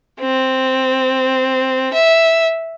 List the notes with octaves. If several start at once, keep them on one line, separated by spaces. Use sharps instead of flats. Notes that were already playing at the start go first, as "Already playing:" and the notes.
C4
E5